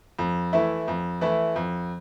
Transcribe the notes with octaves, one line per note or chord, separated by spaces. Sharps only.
F2
E3 A3 E4
F2
E3 A3 E4
F2